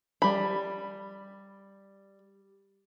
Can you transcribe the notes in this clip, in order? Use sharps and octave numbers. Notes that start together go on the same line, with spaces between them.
G3 B5